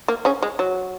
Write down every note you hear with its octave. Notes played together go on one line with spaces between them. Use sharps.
A#3
C#3 C#4
G#3
F#3